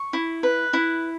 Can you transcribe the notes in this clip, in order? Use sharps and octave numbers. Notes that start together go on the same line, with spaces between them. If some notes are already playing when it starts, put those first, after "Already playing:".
Already playing: C#6
E4
B4
E4